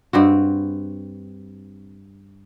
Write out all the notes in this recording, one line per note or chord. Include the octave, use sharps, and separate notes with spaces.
G2 C4 F#4